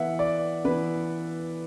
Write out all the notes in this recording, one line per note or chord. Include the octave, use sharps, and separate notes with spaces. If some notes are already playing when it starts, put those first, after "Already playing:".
Already playing: E3 B3 E5 F#5
D5
E3 B3 B4